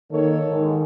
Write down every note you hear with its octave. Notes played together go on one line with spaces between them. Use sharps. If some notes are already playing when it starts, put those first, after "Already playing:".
D#3 A#3 A4 C#5
G#2 D#3